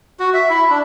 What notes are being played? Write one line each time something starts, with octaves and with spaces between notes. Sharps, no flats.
F#4
E5
E4
D4